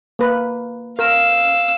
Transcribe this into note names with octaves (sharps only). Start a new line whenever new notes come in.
A#3 B4
A#4 F5 E6